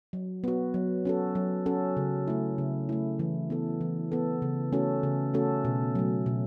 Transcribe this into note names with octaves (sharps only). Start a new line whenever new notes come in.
F#3
B3 F#4
F#3
C#4 F#4 A4
F#3
C#4 F#4 A4
C#3
A3 E4
C#3
A3 E4
E3
B3 A4
E3
B3 A4
C#3
A3 C#4 F#4 A4
C#3
A3 C#4 F#4 A4
B2
F#3 A3
B2